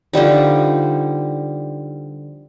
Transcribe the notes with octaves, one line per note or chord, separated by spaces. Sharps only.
D3 F3 G3 D#4